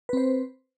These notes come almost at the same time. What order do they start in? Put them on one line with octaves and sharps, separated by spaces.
B4 C4 C5